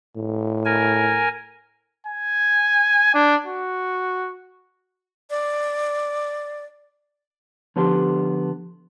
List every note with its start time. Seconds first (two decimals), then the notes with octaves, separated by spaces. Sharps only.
0.16 A2
0.65 A#4 G#5
2.06 G#5
3.14 D4
3.46 F#4
5.30 D5
7.76 D3 F3 B3 G4 C6